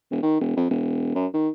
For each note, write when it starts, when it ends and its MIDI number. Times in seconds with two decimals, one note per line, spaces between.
0.11 0.19 28
0.23 0.39 51
0.41 0.55 28
0.56 0.68 41
0.70 1.12 28
1.15 1.26 42
1.34 1.49 51